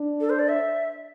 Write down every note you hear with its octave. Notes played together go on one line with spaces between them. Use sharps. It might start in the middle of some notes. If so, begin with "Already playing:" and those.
Already playing: D4
A4
C5
D5
E5